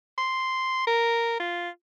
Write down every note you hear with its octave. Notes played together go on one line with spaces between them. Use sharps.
C6
A#4
F4